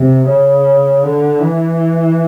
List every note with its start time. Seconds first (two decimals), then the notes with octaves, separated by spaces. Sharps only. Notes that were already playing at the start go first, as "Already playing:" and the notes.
Already playing: C3
0.28 C#3
1.03 D3
1.41 E3